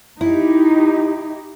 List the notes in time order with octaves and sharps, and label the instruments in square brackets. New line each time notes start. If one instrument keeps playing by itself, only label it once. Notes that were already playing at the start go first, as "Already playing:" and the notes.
[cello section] D#4 G4 [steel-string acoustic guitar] E4